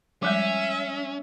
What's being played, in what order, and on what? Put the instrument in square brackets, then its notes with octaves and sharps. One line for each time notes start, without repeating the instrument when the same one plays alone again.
[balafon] F3 G3 G#3 [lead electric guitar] C#4 [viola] E5